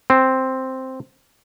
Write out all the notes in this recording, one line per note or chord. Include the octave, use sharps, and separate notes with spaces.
C4